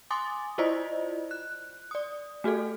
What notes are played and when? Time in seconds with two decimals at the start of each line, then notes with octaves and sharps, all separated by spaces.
0.11 G#5 C6 D6 D#6 A6
0.58 E4 F4 C5 D5 D#5
1.31 F#6
1.91 D5 D#6
2.44 A3 F#4 G#4 A4